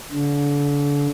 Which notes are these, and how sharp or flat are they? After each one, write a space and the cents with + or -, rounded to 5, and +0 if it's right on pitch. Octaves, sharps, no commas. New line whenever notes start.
D3 -35